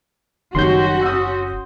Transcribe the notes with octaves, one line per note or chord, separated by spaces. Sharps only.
F#1 D#3 F#3 G3 C#4 F#4 C6 G6
D#6 E6